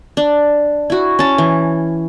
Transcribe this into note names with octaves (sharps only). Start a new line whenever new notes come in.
D4
E4 F#4
C#4 A5
E3